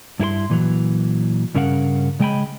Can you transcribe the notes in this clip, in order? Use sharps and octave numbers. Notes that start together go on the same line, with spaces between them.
G2 E4 A4 C6
A#2 E3 F#3
G2 C#3 C#4 A#4 F5 F#5
C#3 G#3 D#5 G5 G#5 B5